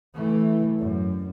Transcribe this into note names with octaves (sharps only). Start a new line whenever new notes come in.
E3 A3
F#2